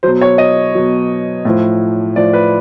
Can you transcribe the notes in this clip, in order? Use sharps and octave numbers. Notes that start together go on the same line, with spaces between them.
B2 F#3 C5
C#5
D#5
B2 F#3
A2 F3
A2 F3 D5
B4